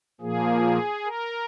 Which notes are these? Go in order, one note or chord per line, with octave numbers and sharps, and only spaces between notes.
A#2 F3 A#3 G#4
A#4